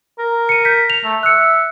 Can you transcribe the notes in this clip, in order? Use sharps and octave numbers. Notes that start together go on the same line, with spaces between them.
A#4
C#7 D#7
G6 B6
F7
A3
E5 F#6 C#7